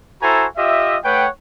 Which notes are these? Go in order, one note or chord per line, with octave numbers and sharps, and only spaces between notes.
E4 F#4 A4 C5 G#5 A#5
F4 G4 D#5 E5
A3 B4 C#5 F#5 G5